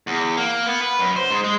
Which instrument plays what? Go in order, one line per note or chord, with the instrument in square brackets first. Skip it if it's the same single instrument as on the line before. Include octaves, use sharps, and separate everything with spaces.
[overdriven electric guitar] E2
A#3
B3
B4
F#2
C5
G#2
G#3